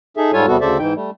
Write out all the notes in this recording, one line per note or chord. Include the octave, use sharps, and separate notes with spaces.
D#4 G#4 A4 E5
G#2 G3 F4 A4 C#5 G#5
E2 C3 G3 B3 F#4 A4
D2 C#3 A4 C5 D5 E5
G#2 E3 D#4 G5
G3 A3